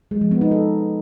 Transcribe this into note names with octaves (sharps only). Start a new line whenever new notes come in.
G#3
F3
B3
D#4
A4